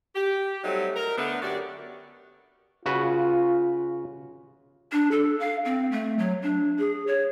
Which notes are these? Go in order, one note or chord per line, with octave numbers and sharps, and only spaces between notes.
G4
F#3 G3 A3 C4 D#4 G4
A#4
D3 A3 B3
F#2 F#4 G4 D5
C#3 F4 F#4 B4
D4
A4
F5
C4
A3
F#3
D4
G#4
C#5